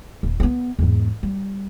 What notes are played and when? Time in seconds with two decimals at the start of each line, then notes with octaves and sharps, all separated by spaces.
0.23 D#1
0.40 B3 C4
0.79 E2 G#2
1.23 G3